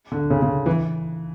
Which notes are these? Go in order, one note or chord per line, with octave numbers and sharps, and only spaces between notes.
D3
C#3
C#3
E3